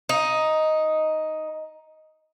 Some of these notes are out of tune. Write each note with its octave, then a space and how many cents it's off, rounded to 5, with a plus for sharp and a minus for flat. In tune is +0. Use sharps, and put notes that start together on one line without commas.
D#4 +5